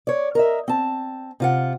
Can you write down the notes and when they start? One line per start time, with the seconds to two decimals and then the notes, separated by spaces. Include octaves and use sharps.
0.07 C#5 D5
0.35 A#4 D#5 E5
0.68 C4 A5
1.40 C3 F4 F#5